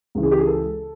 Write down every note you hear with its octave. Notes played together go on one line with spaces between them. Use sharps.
C#2 C#3 E3
G#4
G4
G#4
A4